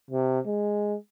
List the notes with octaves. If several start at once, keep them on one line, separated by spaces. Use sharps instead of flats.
C3
G#3